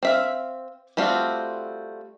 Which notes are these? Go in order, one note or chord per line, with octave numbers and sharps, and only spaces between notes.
C4 E5 F5
G3 A3 C4 F4 F#4